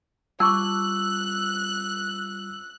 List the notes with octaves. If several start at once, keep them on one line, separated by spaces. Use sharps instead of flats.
G3 F4 A5 C#6 D6 E6 F#6